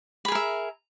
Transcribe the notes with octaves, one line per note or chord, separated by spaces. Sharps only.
G#4 A#4 E5 B5